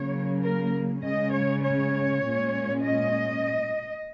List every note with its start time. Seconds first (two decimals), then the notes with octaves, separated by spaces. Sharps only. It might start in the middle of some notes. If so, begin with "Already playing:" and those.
Already playing: C#3 F#3 A#3 C#5
0.43 A#4
1.04 C#3 G#3 C#4 D#5
1.34 C#5
1.64 C#5
2.25 A#2 G#3 C#4
2.84 D#5